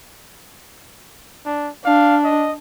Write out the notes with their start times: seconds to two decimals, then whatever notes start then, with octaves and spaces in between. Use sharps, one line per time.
1.46 D4
1.85 D4 F5
2.24 D#5